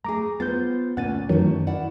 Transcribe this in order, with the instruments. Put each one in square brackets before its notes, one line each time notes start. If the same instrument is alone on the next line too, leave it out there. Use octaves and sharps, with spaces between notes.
[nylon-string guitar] A3 G#4 [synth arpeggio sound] A#5 D6
[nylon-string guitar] B3 F4 C5 [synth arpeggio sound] G6 A6
[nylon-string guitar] D2 A#2 C#4 [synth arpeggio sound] F#5 A6 D#7
[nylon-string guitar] F#2 A3 C#4 [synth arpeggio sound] D#3 E3 F#3
[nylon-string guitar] E4 D5 F#5